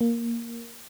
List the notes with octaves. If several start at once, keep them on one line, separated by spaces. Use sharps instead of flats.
A#3